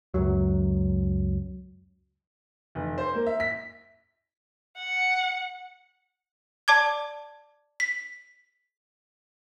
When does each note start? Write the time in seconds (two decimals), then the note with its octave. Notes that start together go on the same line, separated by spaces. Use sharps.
0.14 C#2 F#2 F#3
2.75 F1
2.98 C5
3.15 A#3
3.26 E5
3.40 B6
4.79 F#5
6.68 D5 A5 D6 G#6
7.80 B6